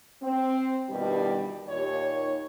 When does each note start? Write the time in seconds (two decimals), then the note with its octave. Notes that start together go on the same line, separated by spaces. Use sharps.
0.22 C4
0.89 G2 B2 D#3 E3 G3
1.67 D#2 A#2 C#5